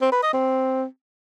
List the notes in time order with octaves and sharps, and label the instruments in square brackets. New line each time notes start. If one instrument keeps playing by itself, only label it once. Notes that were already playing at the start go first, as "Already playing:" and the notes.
[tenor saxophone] C4
B4
D#5
C4